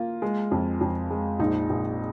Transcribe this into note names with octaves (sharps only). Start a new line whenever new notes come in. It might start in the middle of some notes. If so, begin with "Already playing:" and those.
Already playing: A#3 F4
G#3
F2
F2
G#3
A#1 D#4
A#1